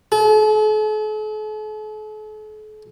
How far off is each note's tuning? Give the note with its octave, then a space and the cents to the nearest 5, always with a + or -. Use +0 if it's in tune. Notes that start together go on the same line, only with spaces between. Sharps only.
A4 -45